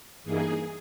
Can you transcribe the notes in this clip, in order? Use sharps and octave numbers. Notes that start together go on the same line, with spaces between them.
G2 E3 A#3 D#4 G#4